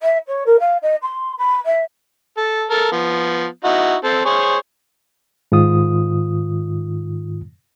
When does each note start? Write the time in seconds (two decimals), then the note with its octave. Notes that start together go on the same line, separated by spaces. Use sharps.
0.01 E5
0.27 C#5
0.46 A#4
0.59 F5
0.82 D#5
1.02 C6
1.38 B5
1.65 E5
2.37 A4
2.70 A4 A#4
2.92 F3 B3
3.64 D#4 E4 F#4
4.04 C4 A4
4.25 G#4 C5 C#5
5.52 G#2 D#3 F4 D#6